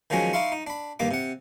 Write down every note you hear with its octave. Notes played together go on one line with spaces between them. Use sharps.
D#3 F3 F#3 G#3 C#4
D#4 E4 F5 C6 C#6
D#4
D4 B5
G2 D#3 A#3 D6
C3 F#5